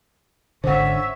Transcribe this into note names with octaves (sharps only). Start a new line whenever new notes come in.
G#1 D3 C#4 C5 E5 F#5